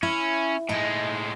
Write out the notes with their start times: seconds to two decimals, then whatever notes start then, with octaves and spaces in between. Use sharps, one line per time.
0.03 C#4 E4
0.69 A2 G#3 D#4